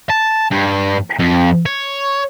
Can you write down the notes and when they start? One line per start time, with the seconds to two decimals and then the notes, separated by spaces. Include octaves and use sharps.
0.10 A5
0.52 G2
1.19 F2
1.66 C#5